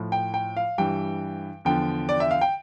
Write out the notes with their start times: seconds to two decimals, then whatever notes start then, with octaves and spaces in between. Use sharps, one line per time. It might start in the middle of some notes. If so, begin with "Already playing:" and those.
Already playing: A2 F3
0.12 G5
0.34 G5
0.57 F5
0.78 G2 E3 G3 G5
1.65 E2 D3 F3 G5
2.09 D5
2.20 E5
2.31 F5
2.41 G5